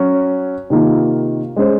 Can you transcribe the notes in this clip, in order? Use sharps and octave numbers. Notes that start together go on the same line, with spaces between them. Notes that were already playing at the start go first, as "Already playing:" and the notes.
Already playing: F#3 C#4 F#4
C3 D#3 A#3 F4
G#3 C#4 G#4 C5